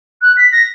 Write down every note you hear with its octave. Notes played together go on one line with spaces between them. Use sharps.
F#6
B6
A#6